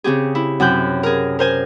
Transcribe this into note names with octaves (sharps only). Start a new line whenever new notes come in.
C#3 C4 G4 G#4
E4
F#2 C3 F#6 G6
G#4 A#4
A#4 C5 G#5